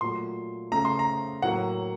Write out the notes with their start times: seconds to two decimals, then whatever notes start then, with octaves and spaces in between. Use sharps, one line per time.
0.01 A#2 F#3 A3 C6
0.72 C#3 A3 A#5
0.85 C6
0.99 A#5
1.42 A2 F#3 A#3 F#5